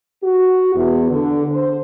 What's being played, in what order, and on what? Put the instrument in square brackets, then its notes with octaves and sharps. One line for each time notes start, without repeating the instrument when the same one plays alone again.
[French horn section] F#4
E2
D3
C5